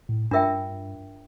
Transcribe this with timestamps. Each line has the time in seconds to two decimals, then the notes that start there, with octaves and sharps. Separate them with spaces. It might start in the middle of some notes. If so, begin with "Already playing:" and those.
0.09 A2
0.31 G2 D4 F4 A#4 E5 G5